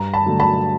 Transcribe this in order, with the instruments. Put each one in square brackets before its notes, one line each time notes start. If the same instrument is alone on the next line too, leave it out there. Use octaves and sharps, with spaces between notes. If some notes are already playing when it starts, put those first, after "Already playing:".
Already playing: [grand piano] G2 [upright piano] A#5
[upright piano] A5 B5
[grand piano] D3 F#3 A3
[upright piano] A5 B5